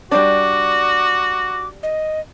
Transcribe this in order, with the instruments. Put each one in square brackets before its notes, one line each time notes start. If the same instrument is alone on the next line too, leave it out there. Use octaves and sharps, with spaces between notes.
[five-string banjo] G3 D4 [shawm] F#4 [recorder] D6
[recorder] D#5